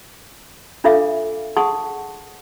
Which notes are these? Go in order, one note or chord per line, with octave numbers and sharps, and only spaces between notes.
D4 F4 A4 E5 F5 D6
G#4 F#5 A5 C6 C#6 D#6